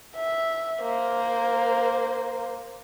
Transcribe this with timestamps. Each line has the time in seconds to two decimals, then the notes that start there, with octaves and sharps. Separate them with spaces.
0.16 E5
0.82 A#3 C5